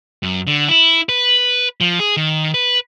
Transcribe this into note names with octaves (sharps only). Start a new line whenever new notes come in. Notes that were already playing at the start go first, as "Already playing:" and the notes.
F#2
D3
E4
B4
F3
G#4
D#3
B4